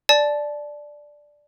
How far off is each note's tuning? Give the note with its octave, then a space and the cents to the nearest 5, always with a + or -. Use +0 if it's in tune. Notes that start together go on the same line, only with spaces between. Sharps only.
D5 +0 A5 -25